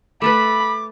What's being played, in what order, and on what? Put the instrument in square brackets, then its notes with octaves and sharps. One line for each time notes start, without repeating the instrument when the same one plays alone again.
[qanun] A3 A4 B4 [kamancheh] B5 [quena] D6